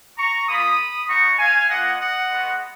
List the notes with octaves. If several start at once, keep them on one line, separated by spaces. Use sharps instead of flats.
A#5 C#6
A#3 F4 B5 D#6
B3 D#4 F#4 A#5 C#6
F5 G#5
A#3 F4 D#5 F#5
D#5 F#5
G#3 B3 F#4